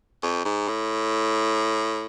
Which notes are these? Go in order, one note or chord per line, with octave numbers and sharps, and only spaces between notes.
F2
G#2
A2